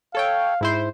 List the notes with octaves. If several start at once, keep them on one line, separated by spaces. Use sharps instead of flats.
A4 C#5 F5 G5
G#2 E4 C5